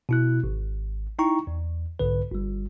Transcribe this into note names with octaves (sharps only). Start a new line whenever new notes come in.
B2 E4 F#6
G#1
D#4 E4 G5 A#5 C#6
E2
B1 G#2 D3 B4
G1 G3